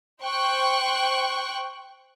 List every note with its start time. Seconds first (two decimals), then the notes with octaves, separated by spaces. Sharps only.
0.23 C5 G5 C#6 F#6